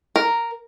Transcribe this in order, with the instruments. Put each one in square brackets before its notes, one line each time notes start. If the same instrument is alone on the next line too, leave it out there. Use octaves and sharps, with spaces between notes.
[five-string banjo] A#4